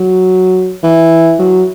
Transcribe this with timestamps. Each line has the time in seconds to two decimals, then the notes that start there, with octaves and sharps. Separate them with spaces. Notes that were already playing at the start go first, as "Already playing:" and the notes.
Already playing: F#3
0.83 E3
1.39 F#3